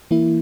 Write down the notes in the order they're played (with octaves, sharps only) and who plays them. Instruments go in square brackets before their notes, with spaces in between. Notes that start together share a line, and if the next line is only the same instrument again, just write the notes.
[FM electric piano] E3 A#3 E4